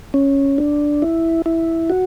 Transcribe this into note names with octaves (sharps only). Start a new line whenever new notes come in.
C#4
D4
E4
E4
F#4